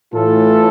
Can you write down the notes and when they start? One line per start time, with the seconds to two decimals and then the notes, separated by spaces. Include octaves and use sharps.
0.14 A2 E3 F4 A4